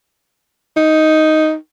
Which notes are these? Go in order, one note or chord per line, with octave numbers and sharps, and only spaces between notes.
D#4